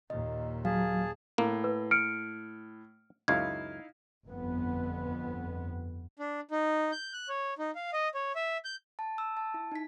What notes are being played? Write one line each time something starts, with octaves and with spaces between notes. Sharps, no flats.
D#2 A#2 D#5
F#3 G#4 F5 A5
A2 A#3
B4
F6 C#7 D7
C#2 F#2 D#4 E4 F5 G#6
G1 F2 B3
D4
D#4
G6
F#6
C#5
D#4
F5
D#5
C#5
E5
G6
A5
E6
A5
E4
D#4 B6